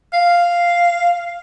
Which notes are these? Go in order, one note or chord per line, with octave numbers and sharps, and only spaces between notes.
F5